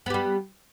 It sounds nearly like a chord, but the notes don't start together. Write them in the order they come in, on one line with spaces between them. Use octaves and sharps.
B3 G4 G3